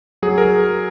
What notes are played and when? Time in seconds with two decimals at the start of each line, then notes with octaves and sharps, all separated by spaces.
0.22 F#3 G#4
0.38 A#4